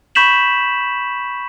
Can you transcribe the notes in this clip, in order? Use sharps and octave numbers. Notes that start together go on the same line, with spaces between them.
B5 C#6 G6 B6 E7 F#7